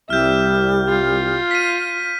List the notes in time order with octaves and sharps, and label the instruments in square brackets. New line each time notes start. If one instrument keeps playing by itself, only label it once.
[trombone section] C2 [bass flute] G3 [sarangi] E5 [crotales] F6 G6
[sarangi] F4
[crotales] B6 D#7